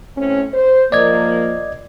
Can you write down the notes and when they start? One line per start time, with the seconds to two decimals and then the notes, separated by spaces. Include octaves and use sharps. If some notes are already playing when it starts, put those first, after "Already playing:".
0.17 A2 C4 C#4
0.54 C5
0.92 F3 A#3 D5 D#5 G#6